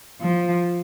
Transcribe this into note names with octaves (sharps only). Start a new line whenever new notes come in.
F3